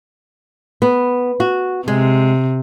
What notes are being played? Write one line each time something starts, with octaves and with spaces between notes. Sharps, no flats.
B3
F#4
C3 G#3